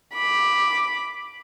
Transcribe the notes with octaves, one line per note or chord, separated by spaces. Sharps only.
B5 D6